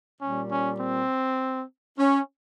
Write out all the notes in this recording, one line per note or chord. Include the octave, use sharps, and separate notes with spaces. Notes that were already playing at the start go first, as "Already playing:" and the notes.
A#2 G3 C#4
C#4
C4
C#4